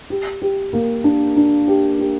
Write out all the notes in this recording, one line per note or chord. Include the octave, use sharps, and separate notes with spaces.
G4
G4
A#3
D4
D4
G4
G4